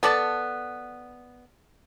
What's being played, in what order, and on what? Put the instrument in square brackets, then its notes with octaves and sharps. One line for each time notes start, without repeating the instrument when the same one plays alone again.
[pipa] B3 A4 D5 A5